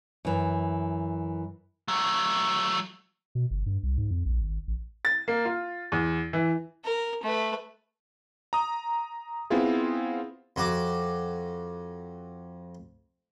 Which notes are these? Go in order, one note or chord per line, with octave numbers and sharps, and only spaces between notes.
F#2 E3
F#3 A3
B2
G1
G2
C2
G#2
F2
A#1
G#1
A1
A6
A#3
F4
E2
E3
A#4
A3 B4
A#5 D#6
B3 C4 E4 F4 G#4
F2 F#4 D6